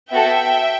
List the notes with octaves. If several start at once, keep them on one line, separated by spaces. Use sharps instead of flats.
B3 F#4 A4 E5 G5